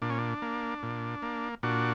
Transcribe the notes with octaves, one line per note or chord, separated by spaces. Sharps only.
A#2 D4
C#4
D4
A#3
A#2
A#3
A#2 D4 F#4